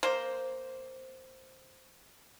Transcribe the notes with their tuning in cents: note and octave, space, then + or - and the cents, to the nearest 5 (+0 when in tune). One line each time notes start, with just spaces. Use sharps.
A#3 +0 C5 +0